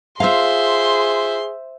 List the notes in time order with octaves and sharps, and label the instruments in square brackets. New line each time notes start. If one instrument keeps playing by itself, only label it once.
[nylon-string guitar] F4 F5 [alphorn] G#4 [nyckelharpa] C5 E5 [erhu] C6